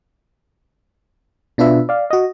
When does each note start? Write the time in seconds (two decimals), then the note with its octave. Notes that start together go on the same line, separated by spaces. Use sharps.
1.58 B2 D4 F4 B4 E5
1.89 D5 F5
2.10 F#4 D#5